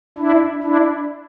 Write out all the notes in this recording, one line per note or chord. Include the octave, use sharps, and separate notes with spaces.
D4 E4
D4 E4